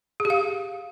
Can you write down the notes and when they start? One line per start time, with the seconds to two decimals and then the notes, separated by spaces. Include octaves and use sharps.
0.20 G#4
0.25 G4
0.30 F5